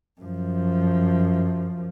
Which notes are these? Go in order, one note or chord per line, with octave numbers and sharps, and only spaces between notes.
F#2 F3